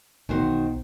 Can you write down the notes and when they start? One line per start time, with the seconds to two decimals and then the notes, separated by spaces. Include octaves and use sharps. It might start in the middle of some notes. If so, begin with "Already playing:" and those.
0.29 B1 D#3 E3 F#4 C5